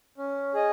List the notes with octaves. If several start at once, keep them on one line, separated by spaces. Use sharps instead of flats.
C#4
G#4 D#5